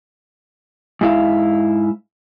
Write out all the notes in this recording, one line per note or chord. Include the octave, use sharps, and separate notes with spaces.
G#2 E4 F5